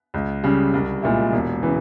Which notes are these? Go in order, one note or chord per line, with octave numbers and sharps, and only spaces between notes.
C#2
C#3 G3
C2
A#2 G#3 E4
E1
C#3 E3